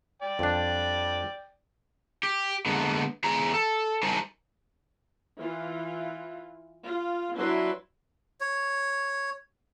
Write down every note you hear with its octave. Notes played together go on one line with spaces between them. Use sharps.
D5 G5
F2 D4
G4
D3 G#3 A#3 B3
E2 G#4 A#5
A4
G3 D#4 A#4 C5 G#5 A5
E3 F4
F4
F#3 D4 E4 B4 C6
C#5